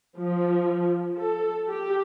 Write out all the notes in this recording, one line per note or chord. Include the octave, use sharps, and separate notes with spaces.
F3
A4
G4